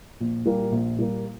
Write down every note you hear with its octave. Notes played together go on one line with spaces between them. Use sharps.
A#1
A#2 G3 A#3
A#1
A#2 G3 A#3